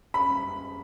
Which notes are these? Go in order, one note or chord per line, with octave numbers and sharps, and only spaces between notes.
B5